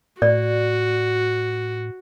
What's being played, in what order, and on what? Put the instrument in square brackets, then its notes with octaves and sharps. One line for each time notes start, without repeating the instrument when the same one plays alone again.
[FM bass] A2 [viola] F#4 [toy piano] D5